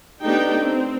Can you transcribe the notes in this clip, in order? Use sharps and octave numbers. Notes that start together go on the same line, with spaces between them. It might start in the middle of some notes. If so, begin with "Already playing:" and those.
A3 B3 D4 D#4 G4 G5
C4